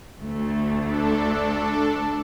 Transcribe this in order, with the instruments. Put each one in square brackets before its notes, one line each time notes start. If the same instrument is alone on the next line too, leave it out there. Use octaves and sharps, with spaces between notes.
[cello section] D2 A3
[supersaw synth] D4 A4